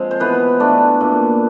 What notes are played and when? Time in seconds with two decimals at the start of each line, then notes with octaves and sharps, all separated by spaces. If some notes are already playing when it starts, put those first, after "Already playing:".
Already playing: F3 G#3 C4
0.11 C5
0.20 E3 B3 B4
0.60 A3 D4
1.01 A#2